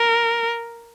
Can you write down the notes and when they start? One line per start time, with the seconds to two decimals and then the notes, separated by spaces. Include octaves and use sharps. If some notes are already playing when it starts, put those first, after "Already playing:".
Already playing: A#4